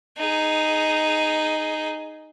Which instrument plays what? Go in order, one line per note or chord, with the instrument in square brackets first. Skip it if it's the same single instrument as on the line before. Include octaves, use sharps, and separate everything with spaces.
[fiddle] D#4 G#4